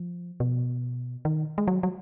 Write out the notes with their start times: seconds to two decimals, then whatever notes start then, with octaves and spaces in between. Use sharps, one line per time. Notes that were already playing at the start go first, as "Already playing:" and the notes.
Already playing: F3
0.40 B2
1.25 D#3
1.58 G#3
1.68 F#3
1.83 F#3